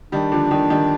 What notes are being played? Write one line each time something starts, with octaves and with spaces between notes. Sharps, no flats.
D#3 G3 D4
D3 F3
D#3 G3
D#3 G3